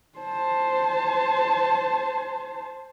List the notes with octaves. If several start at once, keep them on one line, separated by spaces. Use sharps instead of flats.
C5 A5